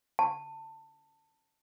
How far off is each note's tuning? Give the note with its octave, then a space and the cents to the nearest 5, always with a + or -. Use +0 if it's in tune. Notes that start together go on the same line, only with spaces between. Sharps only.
A5 +20